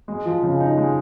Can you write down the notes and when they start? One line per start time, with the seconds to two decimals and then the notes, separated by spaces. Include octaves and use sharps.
0.08 G#3
0.25 F3
0.43 C#3
0.60 D#4
0.78 G#3